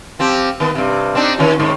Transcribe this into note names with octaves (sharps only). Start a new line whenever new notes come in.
F3 C4 G4
D#3 B3
G2 C3
C4 D4 D#4
D#3 C#4 F#4
G#2 D#3